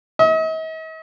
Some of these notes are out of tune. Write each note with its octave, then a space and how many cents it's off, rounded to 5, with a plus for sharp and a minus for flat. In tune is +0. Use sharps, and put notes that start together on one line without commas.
D#5 +45